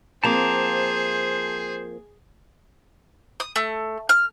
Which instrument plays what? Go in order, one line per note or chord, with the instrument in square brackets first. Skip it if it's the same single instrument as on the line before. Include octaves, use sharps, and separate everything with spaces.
[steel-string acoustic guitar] F3 A#3 C4 [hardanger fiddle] G#4 [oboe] C5 [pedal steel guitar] A5 A#5 D6
[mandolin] D#6
A3
F6